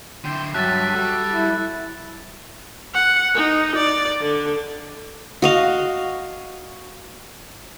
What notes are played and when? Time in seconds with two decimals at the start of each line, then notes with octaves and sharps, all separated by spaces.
0.25 D3 E4 G5 C6
0.54 G2 F#3 G4 E5 A5 F#6 A6
0.95 G3 F#4 A4
1.33 E4
2.94 F#5
3.35 D#4
3.76 D5
4.21 D3
5.42 F#4 D#5 F5